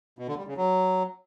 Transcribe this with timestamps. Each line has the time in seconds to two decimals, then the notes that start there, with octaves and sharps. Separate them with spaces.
0.19 B2
0.28 D3
0.38 G3
0.47 C#3
0.57 F#3